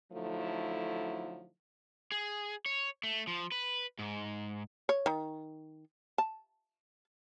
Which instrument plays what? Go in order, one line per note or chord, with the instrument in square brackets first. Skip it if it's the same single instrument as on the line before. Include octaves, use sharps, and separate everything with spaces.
[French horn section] D3 F3 F#3 A3 D#4 E4
[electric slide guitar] G#4
C#5
A3
F3
B4
G#2
[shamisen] C#5
D#3
A5